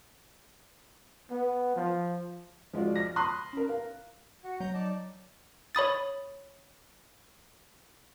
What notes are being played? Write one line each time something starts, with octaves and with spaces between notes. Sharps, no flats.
B3
F3
F3 G#3 F4 F#4 D5
F6 A#6
B5 C6 D#6 F#6
C#4 A#4
A#4 F5
F#4
F#3 A#5 G6
D#4 D5 A5
C#5 B5 D#6 A6